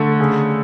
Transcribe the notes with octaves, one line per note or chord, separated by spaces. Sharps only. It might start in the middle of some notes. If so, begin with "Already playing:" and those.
Already playing: D3 A3
C#3